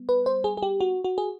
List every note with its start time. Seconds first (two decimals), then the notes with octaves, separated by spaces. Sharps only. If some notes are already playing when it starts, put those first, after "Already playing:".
Already playing: G3 B3
0.09 B4
0.26 C5
0.44 G#4
0.57 G#4
0.63 G4
0.81 F#4
1.04 F#4
1.18 G#4